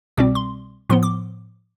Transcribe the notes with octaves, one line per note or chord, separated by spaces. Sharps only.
C2 B2 G3 C4 D6
C6
A2 F3 B3 C6
D6